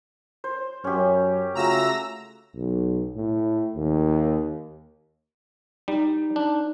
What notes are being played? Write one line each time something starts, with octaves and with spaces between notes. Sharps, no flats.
C5
F#2 C#4 G4
C#3 A3 F4 F#4 A#5 E6 A#6
B1
A2
D#2
G3 D#4
D4